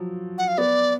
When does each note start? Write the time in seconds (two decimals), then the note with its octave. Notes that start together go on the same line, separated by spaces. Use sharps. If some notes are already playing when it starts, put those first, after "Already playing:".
Already playing: F3 F#3
0.38 F#5
0.48 F5
0.58 B3 D5